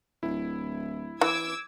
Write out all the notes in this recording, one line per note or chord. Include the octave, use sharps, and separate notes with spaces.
D1 E4
E3 D6 E6 G#6